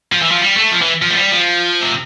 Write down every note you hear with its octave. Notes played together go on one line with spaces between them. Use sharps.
F3
E3
F3
G3
A3
F3
E3
F3
A3
G3
F3
C3